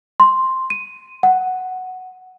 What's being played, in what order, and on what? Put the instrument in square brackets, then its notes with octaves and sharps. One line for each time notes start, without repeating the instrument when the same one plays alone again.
[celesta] C6
D#7
F#5